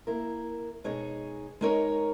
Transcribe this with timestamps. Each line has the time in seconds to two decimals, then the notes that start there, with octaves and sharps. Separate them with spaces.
0.07 A#3 E4 A#4
0.84 B2 G#3 D#4 G#4 C#5
1.61 G#3 D#4 A#4 C#5